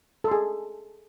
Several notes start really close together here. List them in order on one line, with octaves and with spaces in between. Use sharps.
A4 C6 G#4